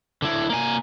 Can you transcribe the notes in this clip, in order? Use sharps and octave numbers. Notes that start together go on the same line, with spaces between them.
D3 E4
A#3 G#5